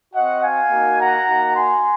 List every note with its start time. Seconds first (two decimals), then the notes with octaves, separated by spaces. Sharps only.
0.14 C4 F#4 D#5 F#5
0.42 F5 G#5
0.71 A#3 D#4 F#4
1.00 F#5 A#5
1.28 A#3 D#4 F#4
1.55 G#5 C6